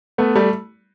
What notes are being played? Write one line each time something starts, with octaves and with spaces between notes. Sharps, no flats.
A3 B3
G3 A3